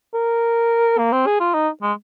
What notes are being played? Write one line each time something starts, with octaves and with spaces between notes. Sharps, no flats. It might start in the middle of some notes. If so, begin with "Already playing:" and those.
A#4
A#3
C4
G#4
F4
D#4
G#3